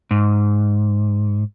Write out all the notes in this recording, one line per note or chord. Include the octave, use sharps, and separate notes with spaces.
G#2